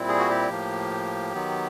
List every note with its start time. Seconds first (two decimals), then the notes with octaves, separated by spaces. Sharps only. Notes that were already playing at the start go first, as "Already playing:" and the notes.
Already playing: A#2 G3 C4 E4
0.08 G#4
0.19 F#4
0.29 G4
0.50 A2 F3 A#3
1.34 D#3 F#3 B3